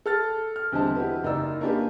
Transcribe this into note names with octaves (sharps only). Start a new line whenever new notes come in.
A4 F6 A6
F6
E2 D3 G3 C4 D#5 A5
E4 F#4 G4 B4
F#1 D#4 D5 A#5 E6
A#3 C#4 D4 G4 B4